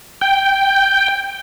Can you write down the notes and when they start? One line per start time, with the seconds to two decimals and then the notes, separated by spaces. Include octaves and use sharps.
0.21 G5